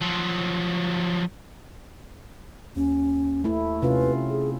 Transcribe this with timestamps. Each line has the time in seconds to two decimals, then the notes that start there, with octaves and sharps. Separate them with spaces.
0.01 F3 F#3
2.76 D#2 C#4
3.44 A3 E4
3.82 C3 C#4 F4 B4
4.30 G#4